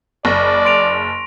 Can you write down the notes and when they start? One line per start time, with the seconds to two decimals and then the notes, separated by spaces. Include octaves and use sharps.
0.25 F#1 D5 C#6 A#6
0.65 C6 D7 F7